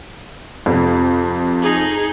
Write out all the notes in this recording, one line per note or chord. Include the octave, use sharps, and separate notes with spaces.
F2 C3
D#4 G#4